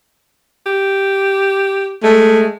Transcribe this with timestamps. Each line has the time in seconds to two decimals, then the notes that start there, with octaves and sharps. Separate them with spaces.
0.66 G4
2.04 G#3 A3